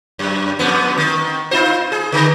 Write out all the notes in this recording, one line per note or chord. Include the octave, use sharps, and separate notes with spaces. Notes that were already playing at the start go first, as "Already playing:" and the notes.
F#2
F2 G#2 B3
D#3
D#4 F4 C5
G#4
D3 D#3